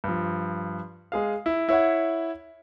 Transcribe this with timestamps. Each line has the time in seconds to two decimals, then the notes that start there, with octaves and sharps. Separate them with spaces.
0.04 G2 F3
1.12 G#3 G#4 F5
1.46 E4
1.69 E4 C#5 E5 F#5